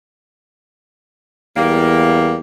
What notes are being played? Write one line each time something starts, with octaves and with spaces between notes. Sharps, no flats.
E2 G3 A#3